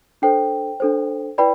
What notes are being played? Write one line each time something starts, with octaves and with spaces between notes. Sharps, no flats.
D4 A4 C5 G5
D4 A4 C5
E4 B4 D5 G5 B5